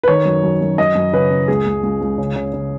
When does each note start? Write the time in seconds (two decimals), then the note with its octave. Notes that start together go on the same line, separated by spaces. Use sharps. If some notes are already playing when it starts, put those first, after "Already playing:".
0.03 B4
0.08 D#3 C#5
0.25 F#2
0.43 F#2
0.61 F#2
0.78 F#2 D#5
0.95 F#2
1.13 C#3 B4
1.30 C#3
1.48 C#2 G#4
1.66 C#2
1.83 C#2
2.01 C#2
2.18 C#3
2.36 C#3
2.54 C#3